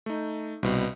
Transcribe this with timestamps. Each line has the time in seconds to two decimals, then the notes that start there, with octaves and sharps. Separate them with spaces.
0.06 A3 D#4
0.63 C2 G2 B2